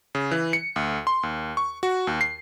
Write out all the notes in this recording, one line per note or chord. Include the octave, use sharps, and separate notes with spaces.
C#3
E3
C#7
D2
C6
D#2
C#6
F#4
D#2
C7